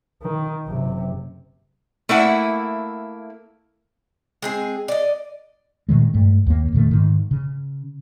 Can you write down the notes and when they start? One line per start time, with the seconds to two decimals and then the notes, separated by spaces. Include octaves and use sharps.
0.23 D#3
0.67 F#1 C3
2.09 A3 A#3 E4 F#5
4.42 G#3 C4 G#4
4.88 D5 D#5
5.89 A#2 D#3 E3 G#3
6.14 G2 A3
6.46 D#2 A#3
6.73 E1 A#2 D#3 A3
6.91 G#2 D#3
7.31 C#3